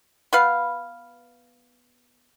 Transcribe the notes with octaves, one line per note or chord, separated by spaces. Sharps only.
B3 B4 F5